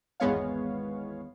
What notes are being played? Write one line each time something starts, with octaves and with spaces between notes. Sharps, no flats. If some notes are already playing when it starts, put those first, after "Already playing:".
G#1 E2 G#3 B3 C#5 F5